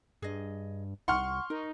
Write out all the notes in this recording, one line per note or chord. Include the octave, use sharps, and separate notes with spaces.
G2 G#4 D#5
C2 F#5 C6 C#6 F6
D#4 A#4